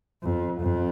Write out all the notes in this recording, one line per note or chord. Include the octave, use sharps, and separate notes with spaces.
F2
F2